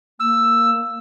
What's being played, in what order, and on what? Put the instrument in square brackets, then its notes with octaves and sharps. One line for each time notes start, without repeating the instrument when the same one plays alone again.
[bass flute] A#3 [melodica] E6